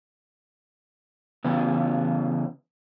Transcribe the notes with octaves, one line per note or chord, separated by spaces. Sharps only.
C#3 E3 B3